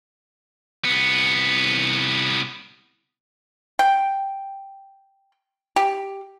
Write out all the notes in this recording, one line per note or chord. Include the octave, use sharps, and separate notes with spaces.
C2 B3
G5
G4